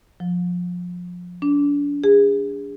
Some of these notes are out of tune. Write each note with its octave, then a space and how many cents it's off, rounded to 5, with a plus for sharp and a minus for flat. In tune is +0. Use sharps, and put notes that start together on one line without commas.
F3 +25
D4 -35
G#4 -30